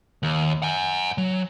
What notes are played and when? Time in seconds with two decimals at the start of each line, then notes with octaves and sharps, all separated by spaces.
0.23 D#2
0.62 F#5 G#5
1.18 F#3